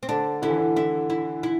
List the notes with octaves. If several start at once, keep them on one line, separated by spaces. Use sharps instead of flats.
C4
D3 D4
D3 E4
E3
D3
D3 E4
E4
E4